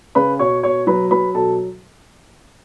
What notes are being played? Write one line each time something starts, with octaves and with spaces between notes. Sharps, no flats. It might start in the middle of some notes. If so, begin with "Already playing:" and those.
C#3 B4 B5
B2 C#5 C#6
B2 C#5 C#6
F#3 B4 B5
F#3 B4 B5
B2 A4 A5